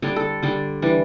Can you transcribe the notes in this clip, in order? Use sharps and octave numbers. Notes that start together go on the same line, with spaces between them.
D3 G3 D4 C#5
A4
D3 G3 D4
E3 G3 D4